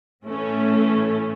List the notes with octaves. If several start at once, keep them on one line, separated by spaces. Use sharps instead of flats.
A2 E3 A3 C#4